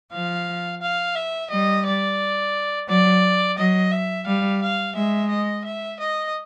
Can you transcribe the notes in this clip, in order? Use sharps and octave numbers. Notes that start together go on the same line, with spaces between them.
F3 F5
F5
E5
G3 D#5
D5
F#3 D5
F#3 D#5
E5
G3 F5
F5
G#3 E5
D#5
E5
D#5